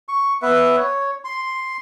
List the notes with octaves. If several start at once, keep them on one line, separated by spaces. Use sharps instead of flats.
C#6
B3 B4 E5
C#5
C6